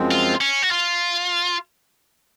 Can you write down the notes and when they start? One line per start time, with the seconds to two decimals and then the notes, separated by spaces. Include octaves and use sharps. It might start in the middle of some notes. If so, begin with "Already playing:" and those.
Already playing: F#2 F3 G#3 C4
0.11 F4
0.41 C#4
0.62 F#4
0.71 F4